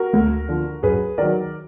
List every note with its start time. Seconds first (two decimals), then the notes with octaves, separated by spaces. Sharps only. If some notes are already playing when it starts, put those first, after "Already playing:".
Already playing: F#4 A#4
0.13 D2
0.49 D3 F3
0.83 F#2 G#4 B4
1.18 D#3 F#3 A#4 D5